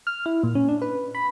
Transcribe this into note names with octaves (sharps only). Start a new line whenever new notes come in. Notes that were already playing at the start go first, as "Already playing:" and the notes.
F6
E4
A#2
C#4
D4
B4
B5